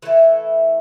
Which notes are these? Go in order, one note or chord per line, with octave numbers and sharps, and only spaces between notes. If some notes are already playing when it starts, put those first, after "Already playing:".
E3 A3 E4 A4